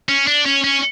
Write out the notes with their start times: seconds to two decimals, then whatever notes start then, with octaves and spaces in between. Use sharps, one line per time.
0.09 C#4
0.27 D4
0.45 C#4
0.64 C#4